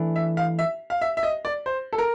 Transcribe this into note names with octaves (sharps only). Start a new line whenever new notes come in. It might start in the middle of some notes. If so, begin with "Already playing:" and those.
Already playing: E3 A3 D4
E5
F5
E5
F5
E5
E5
D#5
D5
C5
A4
A#4